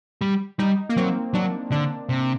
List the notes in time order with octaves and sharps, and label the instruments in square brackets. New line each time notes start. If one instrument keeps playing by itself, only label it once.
[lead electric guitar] G3
[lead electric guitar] G3 [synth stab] D#4
[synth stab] A#3
[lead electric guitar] F#3 [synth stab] C4
[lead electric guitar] F#3 [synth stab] D4
[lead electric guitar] D3 [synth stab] D4
[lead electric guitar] C3